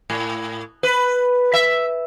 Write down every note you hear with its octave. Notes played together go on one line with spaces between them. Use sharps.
A2
B4
E5